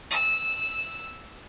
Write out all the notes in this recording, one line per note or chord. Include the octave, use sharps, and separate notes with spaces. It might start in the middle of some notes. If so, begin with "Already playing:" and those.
E6